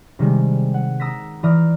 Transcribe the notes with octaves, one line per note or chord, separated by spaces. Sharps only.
C3 D#3 G3 G#3
F#5
A#5 D#6 E6 A#6 B6
E3 D5 A#5 D#6 F6